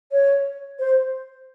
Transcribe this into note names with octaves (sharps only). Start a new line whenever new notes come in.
C#5
C5